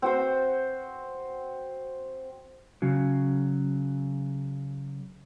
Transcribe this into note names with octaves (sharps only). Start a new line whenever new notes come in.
C4 F#4 C5
C#3 F#3